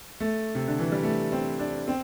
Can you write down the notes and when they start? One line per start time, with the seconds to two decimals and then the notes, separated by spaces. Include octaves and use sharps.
0.20 A3
0.55 C3
0.68 D3
0.79 E3
0.92 G3
1.03 A3
1.32 C4
1.59 D4
1.88 C4